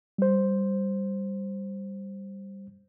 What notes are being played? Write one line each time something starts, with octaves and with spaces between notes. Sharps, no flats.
G3 C5